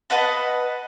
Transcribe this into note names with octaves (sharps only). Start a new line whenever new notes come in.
B4 D#5 F#5 A5